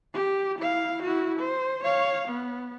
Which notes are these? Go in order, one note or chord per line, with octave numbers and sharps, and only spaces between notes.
G4
E4 F5
E4 F#4
C5
C#5 F5
B3